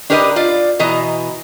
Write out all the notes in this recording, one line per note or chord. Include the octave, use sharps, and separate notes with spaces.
D4 G4 A#4 B4 D5 D#5
F4 D5
B2 E3 D#5 A#5